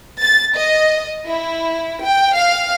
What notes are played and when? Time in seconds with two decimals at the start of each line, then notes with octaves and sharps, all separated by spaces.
0.21 A6
0.58 D#5
1.28 E4
2.04 G5
2.36 F5